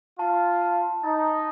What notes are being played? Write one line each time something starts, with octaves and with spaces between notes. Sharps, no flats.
F4 A5
A5
D#4 A6